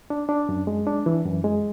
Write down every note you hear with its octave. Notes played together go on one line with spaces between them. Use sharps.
D4
D4
F#2
G#3
D4
E3
F#2
G#3